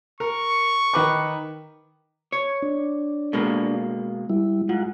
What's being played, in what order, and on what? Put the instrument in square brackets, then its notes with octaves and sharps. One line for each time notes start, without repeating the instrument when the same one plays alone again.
[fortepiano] A#4 [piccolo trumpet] C#6
[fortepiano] D#3 B4 D6
[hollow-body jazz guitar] C#5
[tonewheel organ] D4
[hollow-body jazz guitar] B2 G#3 A#3
[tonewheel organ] G3 E4
[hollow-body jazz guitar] G#2 [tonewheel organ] F4 F#5